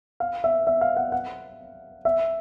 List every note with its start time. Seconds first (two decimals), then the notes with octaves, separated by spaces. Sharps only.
0.20 F5
0.44 E5
0.67 E5
0.81 F5
0.97 F#5
1.12 F#5
2.05 E5